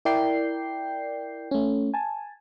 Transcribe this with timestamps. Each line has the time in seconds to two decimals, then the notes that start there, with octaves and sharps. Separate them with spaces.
0.05 E4 A#4 D5 G5 G6 C7
1.51 A3 C#4
1.94 G#5 A5